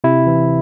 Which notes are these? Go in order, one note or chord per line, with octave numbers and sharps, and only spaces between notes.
C3 E4
E3